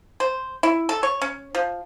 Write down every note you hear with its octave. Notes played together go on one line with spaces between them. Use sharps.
C5
E4
A4
C#5
C#4
F3